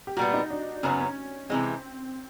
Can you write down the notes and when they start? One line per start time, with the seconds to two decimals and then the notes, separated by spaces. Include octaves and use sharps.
0.07 G4
0.17 A#2 G3 B3 F#4
0.34 D#4
0.50 D4
0.83 F#2 C#3 F#3 B3 C#4
1.01 C#4
1.50 C3 E3 G#3 C4